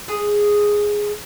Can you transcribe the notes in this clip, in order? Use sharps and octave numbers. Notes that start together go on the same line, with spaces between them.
G#4